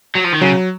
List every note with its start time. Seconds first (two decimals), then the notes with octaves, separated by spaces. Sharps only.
0.15 F#3
0.24 F3
0.32 D#3
0.41 C#3 F#3